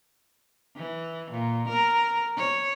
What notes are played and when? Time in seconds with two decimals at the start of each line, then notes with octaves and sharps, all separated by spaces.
0.77 E3
1.31 A#2
1.69 A#4
2.37 C#5